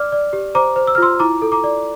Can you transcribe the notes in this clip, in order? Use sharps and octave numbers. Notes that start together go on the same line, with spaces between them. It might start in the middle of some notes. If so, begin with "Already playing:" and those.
Already playing: D5 D6 F6
D5
G4
C5 A#5 D6
C5
E6
F6
F4 C6 E6
E4 A#5 D6
A4
A#5 D6
D5